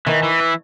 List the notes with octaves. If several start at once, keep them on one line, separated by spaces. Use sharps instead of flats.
D#3 E3
E3
E4